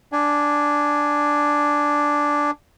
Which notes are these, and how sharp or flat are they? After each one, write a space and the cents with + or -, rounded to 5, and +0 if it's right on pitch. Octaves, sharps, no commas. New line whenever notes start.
D4 +0 G#5 +0